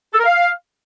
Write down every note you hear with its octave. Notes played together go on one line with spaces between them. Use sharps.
A4
A#4
F5